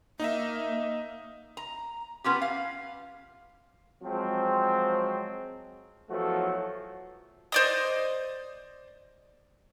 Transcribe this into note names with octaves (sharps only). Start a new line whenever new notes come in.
A#3 D#4 D#5 E5
A#5
B3 C#4 F4 G4
F5
F3 F#3 G#3 C4
E2 F3 F#3 A3 F#4 A4
C5 D5 D#5